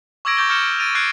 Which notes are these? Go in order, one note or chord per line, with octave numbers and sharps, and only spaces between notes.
C#6 D6 E6 G#6 A#6 D7
C#6 D6 G6 A6 A#6 G7
C#6 F6 G6 C#7 E7 G7
D7
A6 D7 D#7 F7
C#6 F#6 G#6 A6 C7 D7